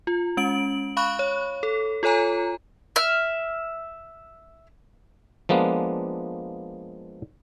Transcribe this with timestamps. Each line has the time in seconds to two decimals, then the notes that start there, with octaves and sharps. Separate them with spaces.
0.07 F4
0.37 G#3 C#4 D7 F#7
0.97 F5 B5 C#6 F#6
1.19 C#5
1.63 A4
2.03 F4 A4 C#5 G#5 A#5
2.96 E5 F6
5.49 F3 G#3 A#3 B3 D4